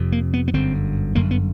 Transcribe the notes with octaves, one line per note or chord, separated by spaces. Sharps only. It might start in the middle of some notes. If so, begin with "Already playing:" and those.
Already playing: F1 F2 C3
A#3
B3
B3
G1 F#2 D3 C4
G1 F#2 D3 A#3
B3